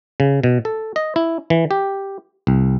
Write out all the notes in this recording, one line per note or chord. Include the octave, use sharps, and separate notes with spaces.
C#3
B2
A4
D#5
E4
E3
G4
C2